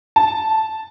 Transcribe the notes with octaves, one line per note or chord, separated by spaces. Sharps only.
A5